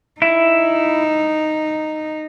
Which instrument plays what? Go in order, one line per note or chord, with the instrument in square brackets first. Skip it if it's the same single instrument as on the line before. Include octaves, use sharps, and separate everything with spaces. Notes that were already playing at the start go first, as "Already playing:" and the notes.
[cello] D#4 [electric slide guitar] E4